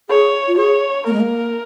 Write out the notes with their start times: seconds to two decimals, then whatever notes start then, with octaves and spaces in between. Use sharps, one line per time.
0.09 G#4 C#5
0.48 F4
0.58 G#4 C#5
1.06 A#3 A#4
1.13 G#3
1.20 A#3